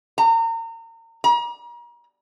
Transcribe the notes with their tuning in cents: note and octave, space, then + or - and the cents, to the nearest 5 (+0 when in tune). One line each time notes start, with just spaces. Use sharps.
A#5 -35
A#5 +40